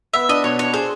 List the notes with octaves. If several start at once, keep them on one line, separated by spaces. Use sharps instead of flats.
B3 E5
D4 D#5
B2 C#5
D4 C#5
G#4 C5